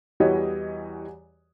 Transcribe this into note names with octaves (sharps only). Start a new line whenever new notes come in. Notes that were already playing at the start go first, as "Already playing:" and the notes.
E2 E3 G3 F#4 C#5 D#5